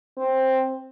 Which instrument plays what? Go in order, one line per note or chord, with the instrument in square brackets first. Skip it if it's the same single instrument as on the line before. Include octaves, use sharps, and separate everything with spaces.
[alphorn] C4